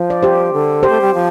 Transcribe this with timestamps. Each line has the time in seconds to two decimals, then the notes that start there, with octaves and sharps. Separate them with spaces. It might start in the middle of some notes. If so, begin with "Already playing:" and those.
Already playing: F3
0.10 D5
0.23 G4 C5
0.53 D3
0.83 G4 C5
0.89 A3
1.01 G3
1.14 F3